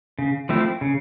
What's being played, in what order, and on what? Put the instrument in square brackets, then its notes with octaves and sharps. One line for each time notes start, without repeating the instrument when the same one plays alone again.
[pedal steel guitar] C#3
F3 A3 C4 E4
C#3